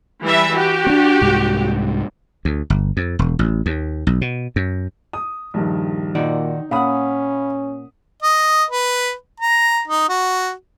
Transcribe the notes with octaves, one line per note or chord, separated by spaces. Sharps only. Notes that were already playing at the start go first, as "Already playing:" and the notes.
E3 G3 E5
F#4 G4
C4 D4
C2 G#2
D2
G1
F2
E1
A1
D#2
B1
B2
F#2
D#6
A#1 G2 D#3
A#2 D#3 D#4 F#4 D5
A#2 C#4 F5 F#5 B5 D#6
D#5
B4
A#5
D#4
F#4